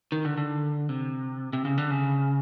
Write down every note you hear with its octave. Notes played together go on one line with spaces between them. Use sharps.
D#3
D3
D3
C3
C3
C#3
D3
C#3